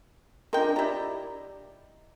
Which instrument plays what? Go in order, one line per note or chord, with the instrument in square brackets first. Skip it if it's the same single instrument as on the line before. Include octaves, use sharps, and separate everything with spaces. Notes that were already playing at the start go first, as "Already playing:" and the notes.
[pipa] G#3 G5 [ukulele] D4 F4 A#4
[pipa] E4 A#5 [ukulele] G4 D5 D#5